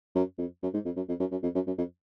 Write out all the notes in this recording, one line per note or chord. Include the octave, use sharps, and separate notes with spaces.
F#2
F2
F#2
G#2
F2
F#2
F2
F#2
F#2
F2
F#2
F#2
F2